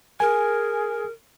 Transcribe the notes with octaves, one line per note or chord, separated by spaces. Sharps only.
G#4 A#4 G#5